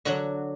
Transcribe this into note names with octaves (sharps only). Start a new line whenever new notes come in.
D3 F#3 F#4